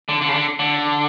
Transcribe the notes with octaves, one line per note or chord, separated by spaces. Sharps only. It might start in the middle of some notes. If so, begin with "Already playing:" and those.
D3
D3
C#3
D3
D3